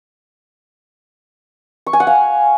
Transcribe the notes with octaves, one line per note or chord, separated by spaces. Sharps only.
C#6
G#5
F#5
F5